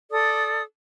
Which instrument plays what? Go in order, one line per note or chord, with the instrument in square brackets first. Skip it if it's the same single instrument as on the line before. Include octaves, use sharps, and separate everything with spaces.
[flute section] A4 D5 D#6